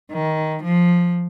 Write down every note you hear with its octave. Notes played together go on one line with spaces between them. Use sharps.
D#3
F3